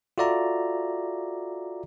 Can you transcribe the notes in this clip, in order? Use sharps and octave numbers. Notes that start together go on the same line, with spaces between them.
F4 F#4 A4 D5 E5 A#5